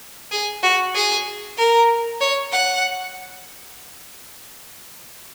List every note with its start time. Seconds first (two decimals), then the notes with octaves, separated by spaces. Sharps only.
0.32 G#4
0.63 F#4
0.95 G#4
1.58 A#4
2.21 C#5
2.52 F#5